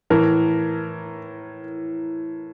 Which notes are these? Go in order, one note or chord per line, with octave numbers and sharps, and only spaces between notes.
A2 E3 A#4